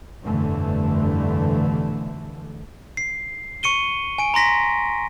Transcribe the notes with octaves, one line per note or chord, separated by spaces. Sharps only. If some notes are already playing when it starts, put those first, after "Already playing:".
F1 G2 B2 D3 E3 A3
C7
C#6 C#7 D#7 G7
G#5 D7
A#5 C6 A#6 B6